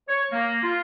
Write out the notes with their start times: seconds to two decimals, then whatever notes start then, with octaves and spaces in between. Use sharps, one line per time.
0.08 C#5
0.32 A#3
0.63 F4